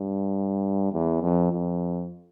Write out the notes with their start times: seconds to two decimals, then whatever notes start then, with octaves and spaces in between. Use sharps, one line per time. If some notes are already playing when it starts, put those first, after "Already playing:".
Already playing: G2
0.92 E2
1.22 F2
1.52 F2